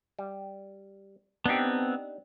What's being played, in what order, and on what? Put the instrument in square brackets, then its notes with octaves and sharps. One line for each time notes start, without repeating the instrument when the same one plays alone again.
[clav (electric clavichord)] G3
[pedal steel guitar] B3 C4 [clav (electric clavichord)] D4 D#4 G4